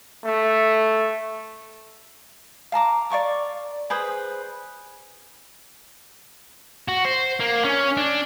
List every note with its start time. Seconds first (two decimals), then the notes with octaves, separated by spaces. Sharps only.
0.24 A3
2.72 F5 A5 A#5 D6
3.10 D5 F5 C#6 D6
3.90 G#4 B4 C5 D#6
6.88 F#4
7.05 C5
7.40 A#3
7.65 C#4
7.97 D4